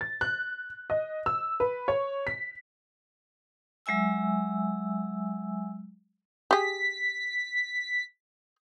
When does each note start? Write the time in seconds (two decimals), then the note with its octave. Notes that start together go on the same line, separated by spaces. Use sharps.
0.01 A6
0.21 F#6
0.90 D#5
1.26 E6
1.60 B4
1.88 C#5
2.27 B6
3.86 F#3 G#3 E5 G#5 E6
6.51 G4 G#4 B6